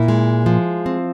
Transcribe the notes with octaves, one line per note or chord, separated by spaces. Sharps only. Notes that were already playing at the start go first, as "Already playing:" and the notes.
Already playing: A#2 E4
G#3
F3
C4